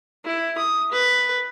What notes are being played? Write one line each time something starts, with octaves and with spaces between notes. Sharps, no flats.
E4
D#6
B4